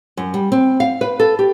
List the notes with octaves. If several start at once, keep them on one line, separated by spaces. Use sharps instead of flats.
F#2
G3
C4
F5
B4
A4
G4